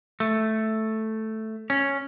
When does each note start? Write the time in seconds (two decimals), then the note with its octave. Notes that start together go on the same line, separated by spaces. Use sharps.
0.20 A3
1.70 C#4